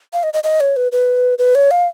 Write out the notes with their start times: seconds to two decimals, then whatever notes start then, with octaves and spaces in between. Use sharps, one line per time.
0.13 F5
0.23 D#5
0.33 D#5
0.44 D#5
0.60 C#5
0.76 B4
0.92 B4
1.38 B4
1.55 C#5
1.71 F5